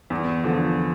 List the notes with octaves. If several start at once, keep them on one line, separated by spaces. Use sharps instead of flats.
E2
D3 F3